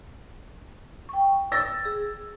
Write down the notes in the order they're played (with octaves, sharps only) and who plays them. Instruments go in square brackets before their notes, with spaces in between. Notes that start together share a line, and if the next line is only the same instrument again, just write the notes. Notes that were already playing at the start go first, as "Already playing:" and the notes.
[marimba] G5 C#6
[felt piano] E6 A6 A#6
[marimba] G#4